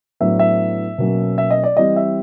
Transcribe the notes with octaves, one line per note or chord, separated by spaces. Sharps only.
A2 F#3 B3 D4 E5
E5
B2 F#3 A#3 C#4
E5
D#5
D5
E3 G3 C4 D#5
E5